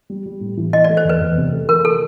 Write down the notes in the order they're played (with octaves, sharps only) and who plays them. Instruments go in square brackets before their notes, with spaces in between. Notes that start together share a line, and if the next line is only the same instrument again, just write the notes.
[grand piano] G3
G3
A2
E3
[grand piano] E3 [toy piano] D#5
[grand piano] A3 [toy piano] D5
[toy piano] C5
[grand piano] E2 [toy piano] B4
[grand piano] E2
C3
A3
[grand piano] E3 [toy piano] A#4
[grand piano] E3 [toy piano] A4